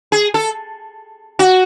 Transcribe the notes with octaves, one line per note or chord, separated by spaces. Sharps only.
G#4
A4
F#4